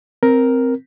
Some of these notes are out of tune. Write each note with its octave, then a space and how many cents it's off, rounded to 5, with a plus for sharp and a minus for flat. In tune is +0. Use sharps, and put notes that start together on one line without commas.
C4 +0 A#4 +5